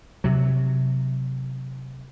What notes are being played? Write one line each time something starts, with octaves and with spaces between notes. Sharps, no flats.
C3 F#3